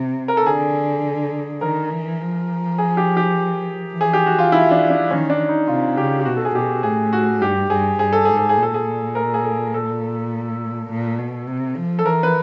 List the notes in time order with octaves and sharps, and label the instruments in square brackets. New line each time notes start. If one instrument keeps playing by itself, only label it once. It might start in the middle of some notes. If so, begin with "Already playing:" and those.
Already playing: [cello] C3
[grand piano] A#4
A4
[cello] D3 [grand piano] G#4
[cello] D#3 [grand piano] A#4
[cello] E3
F3
[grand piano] G#4
G4
G4
[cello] E3
[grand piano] G#4
G4
F#4
F4
E4
D4
D4
[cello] D#3 [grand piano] C#4
[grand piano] D4
D#4
[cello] C3 [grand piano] F4
[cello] C#3 [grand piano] G4
[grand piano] G4
[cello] B2 [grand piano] F#4
[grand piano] A4
G#4
[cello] B2 [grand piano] G4
[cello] A2 [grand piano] G#4
[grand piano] F#4
[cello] G2 [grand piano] G4
[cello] G2 [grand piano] G#4
[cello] G2 [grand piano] G#4
[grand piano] A4
[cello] G#2 [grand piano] G#4
[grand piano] A4
G#4
[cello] A#2
[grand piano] A4
G#4
A#4
G#4
A4
A4
[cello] A#2
B2
C3
F3
[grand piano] A4
[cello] E3 [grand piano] A#4
[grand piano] B4